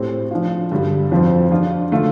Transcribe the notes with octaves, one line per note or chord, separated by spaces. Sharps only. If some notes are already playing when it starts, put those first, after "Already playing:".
Already playing: A2 A3 C4 G4
F3 D4 F4
G2 D3 G3
F2 F3 C4
F3 D4 F4
D3 A3 F4